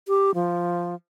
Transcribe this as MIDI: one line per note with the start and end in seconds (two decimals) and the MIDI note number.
0.08 0.31 67
0.35 0.95 53